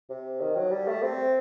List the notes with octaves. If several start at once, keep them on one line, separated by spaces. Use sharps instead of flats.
C3
D#3
F#3
G3
A3
C4